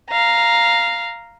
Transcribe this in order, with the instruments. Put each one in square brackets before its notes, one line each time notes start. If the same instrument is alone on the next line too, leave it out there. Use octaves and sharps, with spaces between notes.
[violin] F5 A#5